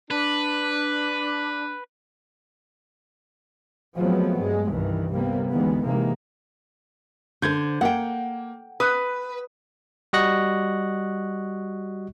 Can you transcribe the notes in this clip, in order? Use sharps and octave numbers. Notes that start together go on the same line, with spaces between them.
D4 B4
F3 F#3 G#3 A3 B3 C4
G2 G#3
C2 G2 D#3 E3
C3 G3 A#3 B3
D2 D#3 E3 G#3 B3
C3 D#3 E3 G#3 A#3
D3 C5 G6 G#6
A#3 F#5 G5
B4 D#6
G3 F#4 D#5 C#6 F#6 A#6